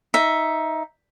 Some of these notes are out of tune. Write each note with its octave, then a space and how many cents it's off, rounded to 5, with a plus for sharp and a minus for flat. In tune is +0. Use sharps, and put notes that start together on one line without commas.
D#4 +15 E5 +0